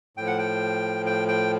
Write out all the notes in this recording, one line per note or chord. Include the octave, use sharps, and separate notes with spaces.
A2 F3 G5
F#5
G5
G5
G5